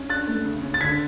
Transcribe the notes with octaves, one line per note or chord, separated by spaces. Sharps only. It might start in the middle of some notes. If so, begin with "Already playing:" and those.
Already playing: C#4
D4 F#6 A6
A3
C#3
C#4
A6
D3 G#6 B6